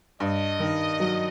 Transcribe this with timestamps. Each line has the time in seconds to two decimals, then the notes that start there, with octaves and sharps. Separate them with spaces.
0.20 G2 D#5
0.60 D#3
1.00 F#3